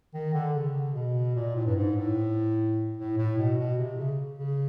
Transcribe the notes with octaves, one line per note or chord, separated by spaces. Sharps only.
D#3
D3
C#3
B2
A#2
A2
G2
G#2
A2
A2
A2
B2
B2
C3
C#3
C#3